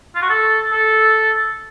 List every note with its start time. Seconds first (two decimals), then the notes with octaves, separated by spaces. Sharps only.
0.15 F4
0.22 F#4
0.30 A4
0.72 A4